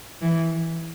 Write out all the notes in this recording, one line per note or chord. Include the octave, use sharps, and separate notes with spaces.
E3